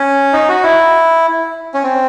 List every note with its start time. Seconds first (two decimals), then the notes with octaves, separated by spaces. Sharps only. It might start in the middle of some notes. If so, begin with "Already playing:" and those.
Already playing: C#4
0.33 D#4
0.49 F#4
0.63 E4
1.74 C#4
1.83 C4